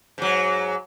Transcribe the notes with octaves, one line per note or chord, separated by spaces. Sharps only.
G#2 F#3